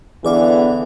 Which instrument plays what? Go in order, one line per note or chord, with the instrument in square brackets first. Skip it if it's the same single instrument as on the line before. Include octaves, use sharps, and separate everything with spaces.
[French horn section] D3 E3 B3 [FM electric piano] G#4 D5 F5